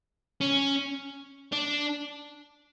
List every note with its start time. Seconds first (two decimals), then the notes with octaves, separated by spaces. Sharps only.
0.41 C#4
1.52 D4